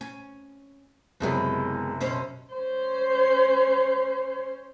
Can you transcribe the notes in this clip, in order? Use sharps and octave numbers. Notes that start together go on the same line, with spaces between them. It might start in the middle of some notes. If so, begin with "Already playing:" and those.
C#4
F#1 C3 E3 F#3 G#3 B3
B2 C#4 C5
C#4 C5